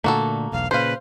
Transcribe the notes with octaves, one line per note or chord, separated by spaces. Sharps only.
A#2 D3 A3 A#3 F#4 A4
E1 B1 F5
A#2 C#3 B4 C5 F5